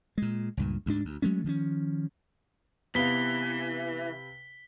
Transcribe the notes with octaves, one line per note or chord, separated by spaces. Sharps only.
A#2 G#3
C#2 G2 A#2
D2 G#2 D4
D2
F#3 G#3 A3 C#4
D#3 F3 C4 C#4
C3 E3 B3 B4 F5 B6 G7